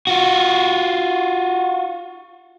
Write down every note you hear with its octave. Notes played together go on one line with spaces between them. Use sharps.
F4 F#4